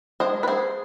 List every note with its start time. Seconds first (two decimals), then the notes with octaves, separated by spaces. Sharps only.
0.20 G#3 D4 C5 D#5
0.43 B4
0.48 G#4 C5